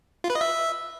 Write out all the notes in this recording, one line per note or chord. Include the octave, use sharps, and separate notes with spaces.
F4
B4
D#5
E5